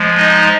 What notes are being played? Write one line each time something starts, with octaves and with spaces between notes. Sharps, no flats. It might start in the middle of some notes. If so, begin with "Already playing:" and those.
Already playing: F3 G#3
D#4 D#5